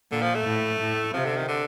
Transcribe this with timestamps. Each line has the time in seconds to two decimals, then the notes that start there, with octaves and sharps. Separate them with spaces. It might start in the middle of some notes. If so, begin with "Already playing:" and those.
0.12 A#2 D3
0.22 F3
0.35 A3
0.46 A2
0.80 A2
1.14 C3 F3
1.25 D3
1.37 D#3
1.48 D3